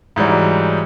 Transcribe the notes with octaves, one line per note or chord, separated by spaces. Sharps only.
G#2 E3 F#3 G3